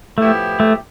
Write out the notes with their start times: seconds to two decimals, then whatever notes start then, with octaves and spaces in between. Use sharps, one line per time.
0.18 A2 F3 A3 B3 E4 G4
0.60 A3